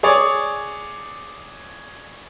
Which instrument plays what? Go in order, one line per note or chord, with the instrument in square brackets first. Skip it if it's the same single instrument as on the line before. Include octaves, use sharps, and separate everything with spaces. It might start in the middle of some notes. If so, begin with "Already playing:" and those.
[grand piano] G#4 C#5 D5